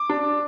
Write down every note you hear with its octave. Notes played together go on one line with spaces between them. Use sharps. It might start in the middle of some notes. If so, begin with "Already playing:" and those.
Already playing: D6
D4